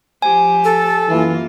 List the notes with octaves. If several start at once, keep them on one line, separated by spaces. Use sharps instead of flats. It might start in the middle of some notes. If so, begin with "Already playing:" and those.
F3 G4 C5 G#5
A4
F#2 E3 A#3 F4